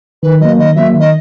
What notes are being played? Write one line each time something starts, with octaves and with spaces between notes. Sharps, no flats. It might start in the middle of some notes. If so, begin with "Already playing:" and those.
D#3 B4
F#3 A#3 D#5
D#3 D#5
F#3 A#3 E5
D#3
D#5